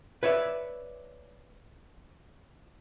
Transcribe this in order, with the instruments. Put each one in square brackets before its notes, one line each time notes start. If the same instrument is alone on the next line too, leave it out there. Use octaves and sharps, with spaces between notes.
[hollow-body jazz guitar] B4 C#5 D5 E5